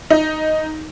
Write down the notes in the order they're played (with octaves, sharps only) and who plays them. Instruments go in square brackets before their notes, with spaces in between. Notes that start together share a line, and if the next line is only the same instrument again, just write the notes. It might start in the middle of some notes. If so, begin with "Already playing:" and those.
[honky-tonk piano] D#4